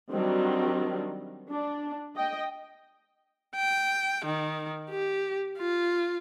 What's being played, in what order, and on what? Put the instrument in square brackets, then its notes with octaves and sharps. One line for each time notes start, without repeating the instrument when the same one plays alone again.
[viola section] D#3 F#3 G3 C4 D4
D4
D#5 G5
[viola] G5
D#3
G4
F4